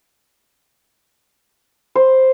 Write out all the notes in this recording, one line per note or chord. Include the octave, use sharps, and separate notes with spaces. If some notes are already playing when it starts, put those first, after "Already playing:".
C5